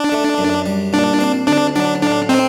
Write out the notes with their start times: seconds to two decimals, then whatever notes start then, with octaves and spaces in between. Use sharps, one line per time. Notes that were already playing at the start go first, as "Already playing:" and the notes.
Already playing: D4
0.12 A3
0.38 F#2
0.66 G3
0.93 A#2 D4
1.20 C4
1.48 D2 D4
1.75 F#3 D4
2.02 A2 D4
2.29 C4 D#4